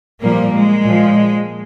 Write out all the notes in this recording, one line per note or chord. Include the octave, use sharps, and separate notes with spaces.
A#2 F3 G3 A#3
G#3
A#2 F3